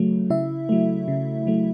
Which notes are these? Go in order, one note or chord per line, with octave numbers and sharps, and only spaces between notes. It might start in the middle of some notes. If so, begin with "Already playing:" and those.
Already playing: C#3 F#3 A3
C#3 E4 E5
F#3 A3
C#3
F#3 A3